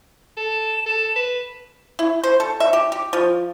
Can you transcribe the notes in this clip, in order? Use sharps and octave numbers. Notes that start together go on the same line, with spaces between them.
A4 E7
A4
B4
E4
C5
A4
E5
G4
G4
F3